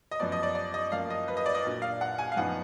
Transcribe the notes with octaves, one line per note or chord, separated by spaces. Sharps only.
D#5
F#2 F3 B3 D5
D#5
D5
D5
D#5
F#2 F3 A#3 F5
D#5
B4
D#5
D5
D#5
A#2 F#3 D4
F5
F#5
G#5
F5
F#2 F3 B3 D#4 F#5